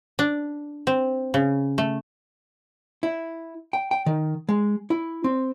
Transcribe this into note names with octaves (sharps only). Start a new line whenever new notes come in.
D4
C4
C#3
A3
E4
G5
G5
D#3
G#3
E4
C4